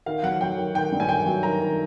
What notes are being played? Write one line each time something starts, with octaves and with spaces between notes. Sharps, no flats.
D#3 F5
F#3 F#5
F#3 G5
D#3
D#3 G5
G2
G#5
D#3 G5
F#3
D#3 A#5
D#3